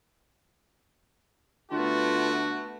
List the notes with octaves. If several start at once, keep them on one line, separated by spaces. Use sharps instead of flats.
D3 A3 B3 F4 F#4